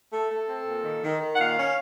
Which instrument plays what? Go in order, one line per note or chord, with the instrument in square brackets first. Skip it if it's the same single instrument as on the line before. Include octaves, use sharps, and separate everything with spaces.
[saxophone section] A3 A4
A3
C4
A#2
D#3
D#3
D#3
F#5
A#2 F5
C#4